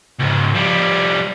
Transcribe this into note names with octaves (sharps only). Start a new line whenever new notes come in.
C#2 G#2
F3 G3